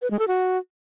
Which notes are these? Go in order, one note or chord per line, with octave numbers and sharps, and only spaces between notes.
B4
G#3
A4
F#4